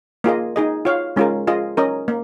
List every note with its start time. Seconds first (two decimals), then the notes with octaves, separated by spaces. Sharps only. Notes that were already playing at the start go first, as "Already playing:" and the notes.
0.24 A#3 F4 G#4 D#5
0.56 D#4 G#4 D#5
0.85 F4 C#5 F5
1.16 G#3 C#4 F4 A#4
1.48 F4 G#4 D#5
1.77 C#4 A#4 D#5
2.08 A#3